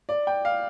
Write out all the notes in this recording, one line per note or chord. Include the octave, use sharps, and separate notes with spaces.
D5
G5
F5